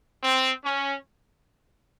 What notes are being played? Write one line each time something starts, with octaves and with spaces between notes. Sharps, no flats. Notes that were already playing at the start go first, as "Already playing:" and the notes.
C4
C#4